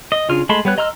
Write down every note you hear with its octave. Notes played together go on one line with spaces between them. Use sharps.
D#5
C#3 D4 F4 F6
G#3 A3 A5 B5 C6
G3 B3 C#5 F#6
D#5 A#5 C6 E6 F6